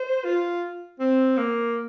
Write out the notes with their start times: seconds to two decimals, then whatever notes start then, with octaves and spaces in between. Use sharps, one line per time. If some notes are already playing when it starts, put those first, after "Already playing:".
Already playing: C5
0.25 F4
1.00 C4
1.37 A#3